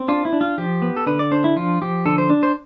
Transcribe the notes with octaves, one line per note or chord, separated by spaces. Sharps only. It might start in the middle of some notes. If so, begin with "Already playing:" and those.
Already playing: C4
D4 F4
E4
D4
F4
F3 G4
B3
A4
D3 B4
D5
D4 C5
E4
F3 F4
F3 G4
D3 A4
C5
D4
C5